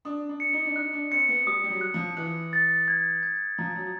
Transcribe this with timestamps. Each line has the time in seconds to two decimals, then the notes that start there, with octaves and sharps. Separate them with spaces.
0.05 D4 D#6
0.29 D4
0.40 C#7
0.53 D#4
0.65 D4
0.76 D#4 F#6
0.93 D4
1.11 C4 C#7
1.28 B3
1.46 G3 D#6
1.64 G3
1.70 F#3
1.81 F#6
1.94 F3
2.17 E3 F#6
2.53 A6
2.88 G#6
3.23 G#6
3.58 F3 A#5
3.76 F#3